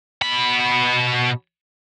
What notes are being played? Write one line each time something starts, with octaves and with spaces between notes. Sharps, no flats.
B2 B5